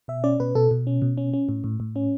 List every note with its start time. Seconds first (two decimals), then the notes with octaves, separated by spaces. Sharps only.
0.08 B2 E5
0.24 C#4 D5
0.40 B2 B4
0.55 B2 A4
0.71 B2
0.87 C#4
1.02 B2
1.17 C#4
1.33 C#4
1.49 A2
1.64 A2
1.80 A2
1.96 C#4